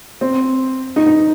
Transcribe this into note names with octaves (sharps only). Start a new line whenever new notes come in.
C4
D#4
D#4